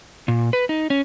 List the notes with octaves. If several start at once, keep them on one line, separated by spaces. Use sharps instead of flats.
A#2
B4
D#4
C#4